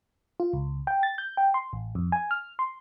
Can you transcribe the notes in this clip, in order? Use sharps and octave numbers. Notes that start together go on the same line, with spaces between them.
F4
C#2
G5
A6
G6
G5
C6
A1
F2
G#5
F6
C6